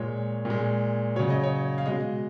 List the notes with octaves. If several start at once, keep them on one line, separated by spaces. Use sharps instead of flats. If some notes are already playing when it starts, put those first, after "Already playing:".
Already playing: A#2 G#3 C#5
A#2 G#3
C#3 F#3 C#5
D#5
C#5
F5
B2 G#3 D#5